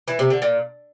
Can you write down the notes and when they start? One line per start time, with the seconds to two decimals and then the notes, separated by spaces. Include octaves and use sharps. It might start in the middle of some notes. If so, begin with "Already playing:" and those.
0.08 E3
0.19 C3
0.30 D3
0.42 A#2